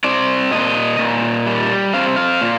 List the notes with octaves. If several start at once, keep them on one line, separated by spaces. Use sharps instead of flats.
C4 D5
A#2 D#5
A#2
G3
C4 F5
F5
A#2